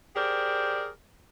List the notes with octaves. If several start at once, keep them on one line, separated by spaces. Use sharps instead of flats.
G4 G#4 A#4 C5 D5